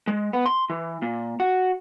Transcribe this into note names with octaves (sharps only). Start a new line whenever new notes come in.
G#3
B3
C6
E3
A#2
F#4